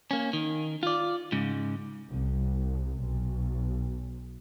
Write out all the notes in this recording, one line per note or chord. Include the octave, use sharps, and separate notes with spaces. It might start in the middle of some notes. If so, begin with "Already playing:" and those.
A#3 C#4
D#3
F4 D5
G#2 C#3
C2
B1